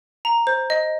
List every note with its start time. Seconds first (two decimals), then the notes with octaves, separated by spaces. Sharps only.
0.25 A#5
0.47 C5
0.70 D#5